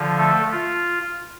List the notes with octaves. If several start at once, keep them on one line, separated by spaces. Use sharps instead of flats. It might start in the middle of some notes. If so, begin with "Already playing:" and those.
Already playing: D3 F3
A3 A4
F4